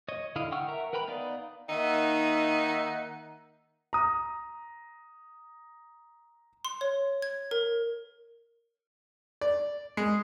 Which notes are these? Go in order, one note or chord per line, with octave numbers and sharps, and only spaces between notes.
C#5 D#5
D3 E4 D#5 F5
F#5 G5 C#6 E6 F6
A#4 E5 F#5 A#5
A#4 B4 G5 A#5 B5
B3 D#4 D5 F5
D#3 A#3 D#4 E5 F#5
A#5 D#6
C6
C#5
G#6
A#4
D5
G#3